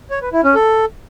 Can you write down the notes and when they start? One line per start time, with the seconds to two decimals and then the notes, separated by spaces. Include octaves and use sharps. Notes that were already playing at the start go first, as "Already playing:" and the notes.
0.11 C#5
0.22 B4
0.33 E4
0.44 C#4
0.55 A4